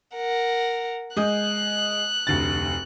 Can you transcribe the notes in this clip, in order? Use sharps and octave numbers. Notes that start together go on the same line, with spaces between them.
A#4 F#5
G#3 D#6 F#6 G6
F1 D2 A6